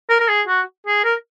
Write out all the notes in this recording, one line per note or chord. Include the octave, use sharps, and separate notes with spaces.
A#4
A#4
G#4
F#4
G#4
A#4